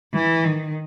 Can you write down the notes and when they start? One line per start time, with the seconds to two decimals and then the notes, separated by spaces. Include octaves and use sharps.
0.13 E3
0.45 D#3